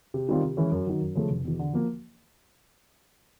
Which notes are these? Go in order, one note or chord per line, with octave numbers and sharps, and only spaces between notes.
C3
D#3 G3 C4 F4
C3
E3 G#3 C#4 E4
F#2
D#3 F#3
F#2
C#3 F3 A3
F1
E2 B2
D3
F3 A#3